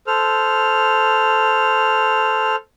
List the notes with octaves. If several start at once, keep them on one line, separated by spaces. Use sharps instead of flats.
A4 C5 F6